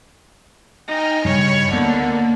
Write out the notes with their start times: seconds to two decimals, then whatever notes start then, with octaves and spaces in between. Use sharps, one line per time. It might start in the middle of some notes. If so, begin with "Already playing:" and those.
0.87 D#4 G5 G#5 F6
1.25 G2 C#3 G3 C#5 B5
1.71 D2 D3 A#3 B3